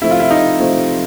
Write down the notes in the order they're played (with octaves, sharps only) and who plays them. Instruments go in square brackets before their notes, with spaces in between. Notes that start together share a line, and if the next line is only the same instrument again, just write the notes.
[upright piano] C3 F3 A3 [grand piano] E4
[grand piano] F4
E4
D#4
[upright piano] C3 F3 A3